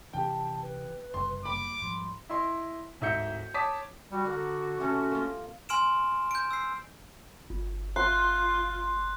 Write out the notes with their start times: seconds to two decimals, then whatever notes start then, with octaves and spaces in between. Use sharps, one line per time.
0.13 C3 E3 C#4 G4 G5 A5
0.62 B4
1.14 F#1 G2 C3 C6
1.46 A#3 B5 D6
1.81 G#2 F3 G3 C6
2.29 E4 D#5 C6
3.01 D1 G#2 E5 G6 C#7
3.54 C#5 A5 D6 D#6 B6
4.11 G3 F#4
4.26 D3 A#4
4.80 C3 A3 C#4
5.11 A#3 F4
5.69 G#5 C6 F6 D7 E7
6.31 G6 D7
6.51 E6 C7
7.50 G1
7.96 F4 C6 F#6